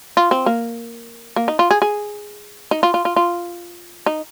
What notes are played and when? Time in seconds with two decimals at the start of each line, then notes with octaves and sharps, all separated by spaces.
0.17 F4
0.31 C4
0.46 A#3
1.36 A#3
1.48 D#4
1.59 F4
1.71 G#4
1.82 G#4
2.71 D#4
2.83 F4
2.94 F4
3.05 F4
3.16 F4
4.06 D#4